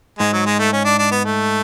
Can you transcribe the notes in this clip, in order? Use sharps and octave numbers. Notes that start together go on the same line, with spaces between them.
G#2 G#3
F#3
G#3
A3
C#4
D4
D4
B3
A3